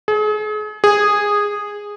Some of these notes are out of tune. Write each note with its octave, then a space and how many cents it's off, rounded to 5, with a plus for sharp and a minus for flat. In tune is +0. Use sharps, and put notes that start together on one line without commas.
G#4 +40
G#4 -10